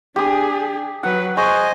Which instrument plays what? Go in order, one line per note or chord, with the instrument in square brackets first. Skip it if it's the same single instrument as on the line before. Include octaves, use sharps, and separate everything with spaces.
[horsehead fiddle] D4 G#4 [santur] G4 D#6
[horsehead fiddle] F#3 B4 [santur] F#5
[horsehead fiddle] G#4 [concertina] C5 D#5 G#5 [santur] C#6